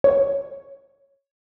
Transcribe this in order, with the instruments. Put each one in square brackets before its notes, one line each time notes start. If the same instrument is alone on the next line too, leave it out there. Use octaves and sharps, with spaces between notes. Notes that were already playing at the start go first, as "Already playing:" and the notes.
[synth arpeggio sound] C#5